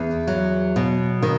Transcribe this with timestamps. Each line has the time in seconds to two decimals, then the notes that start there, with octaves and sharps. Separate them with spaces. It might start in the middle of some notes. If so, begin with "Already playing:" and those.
Already playing: E2
0.27 F#3
0.76 B2
1.22 D#3